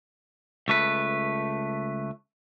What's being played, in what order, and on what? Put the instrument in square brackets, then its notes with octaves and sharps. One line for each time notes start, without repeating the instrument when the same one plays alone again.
[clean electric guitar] C#2 A3 B4